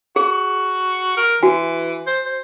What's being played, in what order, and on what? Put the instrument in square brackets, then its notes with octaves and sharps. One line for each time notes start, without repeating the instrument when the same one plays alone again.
[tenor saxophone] F#4 [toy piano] G#4
[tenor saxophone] A#4
[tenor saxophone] E3 [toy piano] F#4 G#5
[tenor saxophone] C5
C5